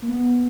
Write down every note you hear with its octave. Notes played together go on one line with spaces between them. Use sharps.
A#3
B3